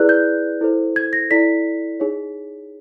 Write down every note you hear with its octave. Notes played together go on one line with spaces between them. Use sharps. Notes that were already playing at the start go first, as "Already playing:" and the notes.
Already playing: E4 G#4 B4 D5 F#6
G6
E4 A4 C5
G#6
A#6
E4 A4 D5 B6
D#4 G#4 C#5